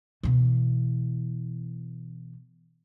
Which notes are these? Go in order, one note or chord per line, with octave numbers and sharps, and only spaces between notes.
B2 E3